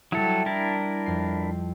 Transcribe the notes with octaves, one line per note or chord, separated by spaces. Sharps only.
F#3 G3 E4 A4
D4 E4 A#4 A5
F2 C7